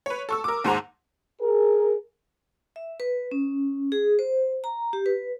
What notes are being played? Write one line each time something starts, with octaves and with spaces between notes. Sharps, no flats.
B4 C#5
A4 C#6 E6
A#4 D6
D#2 G#2 C5 F#5 A#5
G#4 A#4
E5
B4
C#4
G#4
C5
A#5
G4
B4